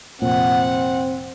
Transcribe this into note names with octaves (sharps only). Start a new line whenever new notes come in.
F1 A#2 C4 F#5